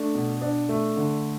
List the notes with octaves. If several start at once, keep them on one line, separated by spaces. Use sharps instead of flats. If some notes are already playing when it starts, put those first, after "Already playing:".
Already playing: A3 D4
B2
D4
A3
D3